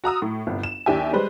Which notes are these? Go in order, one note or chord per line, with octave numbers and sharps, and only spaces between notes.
F#4 A#5 D#6 E6
A2
G1 C2
E7
D#2 D4 E4 G4 E5 G#5
G3 G#3 B4 C5